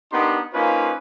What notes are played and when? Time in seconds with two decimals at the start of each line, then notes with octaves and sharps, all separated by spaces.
0.13 B3 D4 D#4 G4 A#4 C6
0.53 A#3 C#4 D#4 F4 B4 C5